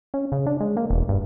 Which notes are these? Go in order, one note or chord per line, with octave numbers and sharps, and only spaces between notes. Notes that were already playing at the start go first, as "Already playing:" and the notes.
C#4
C#3
D4
G#3
A#3
E1
G2